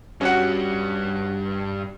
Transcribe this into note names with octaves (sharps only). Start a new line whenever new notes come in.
G2 G3 C#4 F#4 F#5